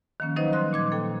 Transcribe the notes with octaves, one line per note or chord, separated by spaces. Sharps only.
D#3 F3 A#3 C#4
F3 F#3 D#4 B4 C5 D#5
G3 C6 F#6
A#2 D6 G#6
A#3 A4 G5